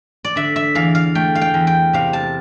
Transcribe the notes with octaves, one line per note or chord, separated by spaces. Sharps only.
D5
D3 E5
E5
E2 F5
F5
A3 G5
F5
G5
E2
G5
C3 F5
A5